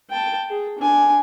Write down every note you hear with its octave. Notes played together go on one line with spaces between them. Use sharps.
G5 A5
G#4
D4 G#5